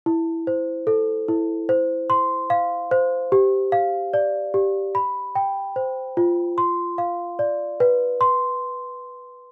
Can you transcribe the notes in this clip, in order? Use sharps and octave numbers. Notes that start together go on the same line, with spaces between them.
E4
C5
A4
E4
C5
C6
F5
C5
G4
F5
D5
G4
B5
G5
C5
F4
C6
F5
D5
B4
C6